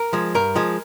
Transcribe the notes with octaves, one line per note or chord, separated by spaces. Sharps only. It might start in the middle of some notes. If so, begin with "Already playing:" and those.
Already playing: A#4
F3 G#3
G2 A#4
F3 G#3